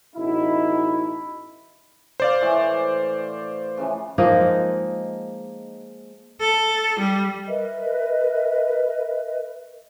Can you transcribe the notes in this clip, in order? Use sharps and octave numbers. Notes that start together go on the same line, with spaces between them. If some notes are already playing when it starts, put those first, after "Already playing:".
A1 B2 D#4 E4
C5 D5 F5
A2 E3 E4
C#3 E3 F3
F3 G#3 A#3 D#4
A4
G3
A#4 B4 D#5 E5